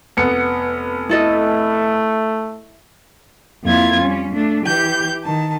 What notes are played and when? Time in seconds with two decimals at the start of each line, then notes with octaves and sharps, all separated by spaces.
0.17 F1 B3 C#7
1.09 A3 E4 A4 D#5
3.63 F2 A#3 E4 F4 G#6
4.00 G3 C#4
4.33 A3 D4
4.64 E3 G4 G6
5.23 D#3 A5